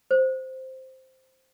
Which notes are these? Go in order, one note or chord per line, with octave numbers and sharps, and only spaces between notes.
C5